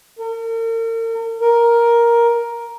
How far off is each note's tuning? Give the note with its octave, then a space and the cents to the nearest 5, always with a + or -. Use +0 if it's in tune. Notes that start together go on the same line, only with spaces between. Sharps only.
A#4 -40
A#4 +10